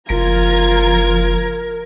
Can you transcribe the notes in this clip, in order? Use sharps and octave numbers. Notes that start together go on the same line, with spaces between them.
F#1 F3 F4 A#4 A#5 G#6